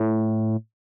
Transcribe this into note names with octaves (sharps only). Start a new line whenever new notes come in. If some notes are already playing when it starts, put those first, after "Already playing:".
Already playing: A2